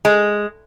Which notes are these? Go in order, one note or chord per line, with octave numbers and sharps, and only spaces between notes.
G#3